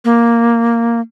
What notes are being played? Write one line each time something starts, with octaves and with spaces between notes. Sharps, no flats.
A#3